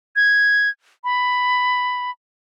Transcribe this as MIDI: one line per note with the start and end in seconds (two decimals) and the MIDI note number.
0.16 0.69 92
1.04 2.11 83